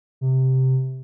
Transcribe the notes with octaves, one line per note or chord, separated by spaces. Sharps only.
C3